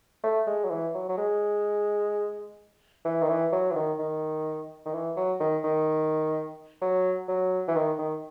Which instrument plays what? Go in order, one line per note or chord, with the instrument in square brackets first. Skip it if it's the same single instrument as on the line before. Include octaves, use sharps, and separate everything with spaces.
[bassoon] A3
G#3
F#3
E3
F#3
F#3
G#3
E3
D#3
E3
F#3
E3
D#3
D#3
D#3
E3
F#3
D#3
D#3
F#3
F#3
E3
D#3
D#3